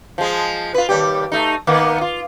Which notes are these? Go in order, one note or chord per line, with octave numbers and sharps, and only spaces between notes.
F3 G#3
F4 B4
D#2 G3 G4
A3 D#4
D#3 A#3 B3
F4